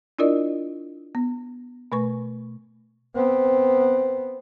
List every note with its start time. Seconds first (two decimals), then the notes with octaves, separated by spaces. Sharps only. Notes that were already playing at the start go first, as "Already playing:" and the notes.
0.19 D4 E4 F4 A#4 D5 D#5
1.15 B3
1.92 B2 A3 B4 C#6
3.15 B3 C4